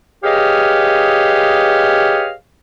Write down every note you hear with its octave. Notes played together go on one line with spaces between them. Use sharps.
G4 G#4 B4 C#5 D#5 F5